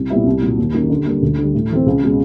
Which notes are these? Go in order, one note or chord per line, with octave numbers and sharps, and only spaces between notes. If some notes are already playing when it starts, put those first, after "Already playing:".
Already playing: C2
A#2 G3 B3 E4
C2
A#2 F#3
D#2
D#3 F#3 A#3 C#4
D3
G3 A#3
D2
D3 G3
A2
E3 A3 C4
C#2
B2 G#3 C#4